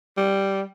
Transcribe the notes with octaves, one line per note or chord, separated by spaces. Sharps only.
G3